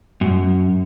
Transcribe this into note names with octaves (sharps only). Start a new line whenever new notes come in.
F#2